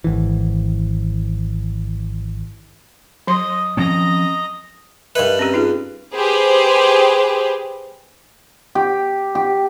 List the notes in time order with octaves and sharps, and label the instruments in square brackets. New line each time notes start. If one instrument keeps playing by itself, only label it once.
[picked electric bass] G#1 E3
[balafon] F#3 C6 [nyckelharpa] D#5
[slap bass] F3 C4 C#4 [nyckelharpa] D#5 A#5
[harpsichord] G2 B4 [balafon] A#4 D#5 E5
[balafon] C4 C#4 G4
D#4 F4 G#4
[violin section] G4 G#4 B4 C5
[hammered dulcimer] G4
G4